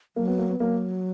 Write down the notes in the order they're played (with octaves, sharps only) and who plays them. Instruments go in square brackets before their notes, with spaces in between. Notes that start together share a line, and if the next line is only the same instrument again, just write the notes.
[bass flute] F#3 [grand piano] A#3
[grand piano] B3
A#3
B3
[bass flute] F#3 [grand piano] A#3